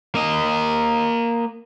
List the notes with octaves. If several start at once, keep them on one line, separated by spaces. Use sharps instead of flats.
A#3 D#5